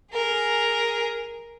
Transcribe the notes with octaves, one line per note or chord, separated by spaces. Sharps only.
G#4 A#4